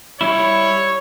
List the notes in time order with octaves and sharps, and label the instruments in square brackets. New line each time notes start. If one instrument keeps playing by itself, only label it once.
[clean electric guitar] G3 E4 [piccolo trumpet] C#5